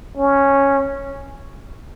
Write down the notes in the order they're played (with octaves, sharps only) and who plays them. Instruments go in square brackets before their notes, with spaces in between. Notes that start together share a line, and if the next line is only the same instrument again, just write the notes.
[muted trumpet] C#4